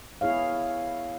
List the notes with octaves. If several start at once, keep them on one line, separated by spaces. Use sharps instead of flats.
B3 E4 G#4 C#5 F5